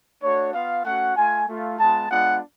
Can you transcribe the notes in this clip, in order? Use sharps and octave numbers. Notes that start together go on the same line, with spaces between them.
A3 D4 F#4 C#5
B3 F4 F5
A3 C#4 F#4 F#5
A3 F4 G#5
A3 F4
G#3 B3 F4 A5
G#3 B3 D4 F4 F#5